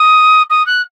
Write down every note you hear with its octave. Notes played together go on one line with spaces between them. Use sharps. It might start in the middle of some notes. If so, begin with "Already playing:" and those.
Already playing: D#6
D#6
F#6